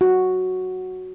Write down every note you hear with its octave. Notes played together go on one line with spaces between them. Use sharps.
F#4